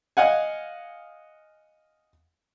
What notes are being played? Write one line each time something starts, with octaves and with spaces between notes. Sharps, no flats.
D#5 F5 F#5 G#5